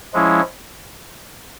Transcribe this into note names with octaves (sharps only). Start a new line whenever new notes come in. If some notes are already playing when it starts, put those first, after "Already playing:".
F3 G#3 C#4 E4